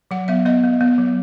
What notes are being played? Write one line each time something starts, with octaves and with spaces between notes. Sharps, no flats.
F#3 F#5
B3 E5
B3 D#5
B3
B3
F#3